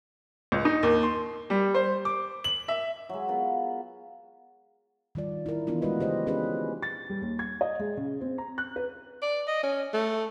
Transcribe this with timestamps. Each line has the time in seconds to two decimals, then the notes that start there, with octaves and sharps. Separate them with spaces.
0.52 C#2
0.65 D#4
0.83 D#2
1.03 C6
1.50 G3
1.74 C5
2.05 D6
2.44 F#7
2.68 E5
3.09 F#3 G#3
3.28 B3 F4 A#4 B4
5.15 D#3 G3 F4 D5
5.46 E4 A#4
5.67 E3 B3 D4 E4 F4
5.82 G#3 A3 F#4 B4 D#5
6.00 C#3 G4 C5 D#5
6.27 B3 C#4 G4 G#4 B4
6.83 A6
7.10 G3
7.21 D#2
7.39 G#6
7.61 D#5
7.79 G#3
7.97 C#3
8.21 C4
8.38 A#5
8.58 F#6
8.76 B4
9.22 D5
9.47 D#5
9.63 C#4
9.93 A3